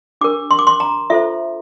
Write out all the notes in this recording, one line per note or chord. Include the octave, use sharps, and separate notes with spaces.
D4 G4 A#4 D6
C6
D6
C6
A#5
F4 A4 C5 E5